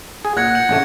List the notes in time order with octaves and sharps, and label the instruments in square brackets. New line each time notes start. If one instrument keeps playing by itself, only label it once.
[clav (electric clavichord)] G#4
[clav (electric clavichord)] A#2 [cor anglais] F#5 [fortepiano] F#6 [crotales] G#6 A#6 C#7
[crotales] G6 C#7 F#7
[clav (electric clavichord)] A1 C#3 A3